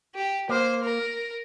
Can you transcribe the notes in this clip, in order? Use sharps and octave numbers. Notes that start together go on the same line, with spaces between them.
G4
A#3 C5
A#4